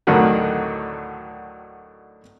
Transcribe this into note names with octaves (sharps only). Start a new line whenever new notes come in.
D2 A2 D3 D#3 F#3